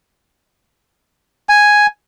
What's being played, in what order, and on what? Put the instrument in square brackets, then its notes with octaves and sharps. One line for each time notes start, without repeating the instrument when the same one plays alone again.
[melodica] G#5